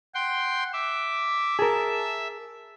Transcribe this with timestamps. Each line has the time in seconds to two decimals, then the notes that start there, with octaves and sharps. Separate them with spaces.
0.15 F#5 G5 C6
0.73 E5 D6
1.59 G#4 A#4 A5